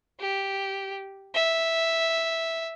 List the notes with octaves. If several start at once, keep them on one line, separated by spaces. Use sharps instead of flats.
G4
E5